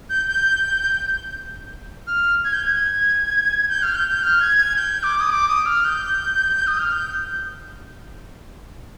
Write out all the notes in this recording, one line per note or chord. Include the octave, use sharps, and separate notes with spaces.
G6
G6
F6
G#6
G6
G#6
G6
F6
G6
G6
F6
G#6
G#6
G6
D6
D#6
D6
D#6
F6
G6
D#6
F6
G6